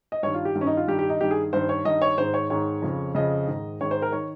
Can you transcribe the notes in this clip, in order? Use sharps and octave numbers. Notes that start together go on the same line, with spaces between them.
D#5
G2 D#3 C#5
F4
G4
G2 D#3
C#4
D#4
F4
G2 D#3 G4
G4
D#4
G2 D#3 G4
G#4
G2 D#3 C5
C#5
G2 D#3 D#5
C#5
G#2 D#3 C5
C#5
G#2 D#3 C#5
F2 C#3
F2 C#3 D#5
G#2 D#3
G#2 D#3 C#5
C5
A#4
D#3 C#5